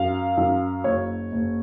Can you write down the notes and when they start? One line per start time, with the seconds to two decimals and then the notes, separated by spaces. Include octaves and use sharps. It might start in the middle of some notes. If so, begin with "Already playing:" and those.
Already playing: F#2 F5
0.37 F#2
0.84 F#1 C#5
1.32 F#1